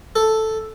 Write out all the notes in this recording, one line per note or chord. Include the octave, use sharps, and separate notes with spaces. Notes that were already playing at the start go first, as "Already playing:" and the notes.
A4